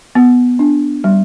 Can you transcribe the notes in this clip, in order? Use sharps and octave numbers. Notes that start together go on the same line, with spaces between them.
B3
D4
G3